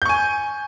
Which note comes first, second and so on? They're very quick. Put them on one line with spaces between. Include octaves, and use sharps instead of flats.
G6 C#6 G#5